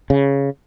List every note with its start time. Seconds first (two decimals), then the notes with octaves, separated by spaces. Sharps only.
0.10 C#3